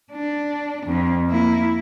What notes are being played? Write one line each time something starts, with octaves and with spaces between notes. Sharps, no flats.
D4
F2
A#3 E4